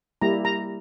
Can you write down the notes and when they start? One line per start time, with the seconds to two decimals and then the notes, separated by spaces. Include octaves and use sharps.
0.21 G3 A#3 E4 G4 A#5
0.45 A#5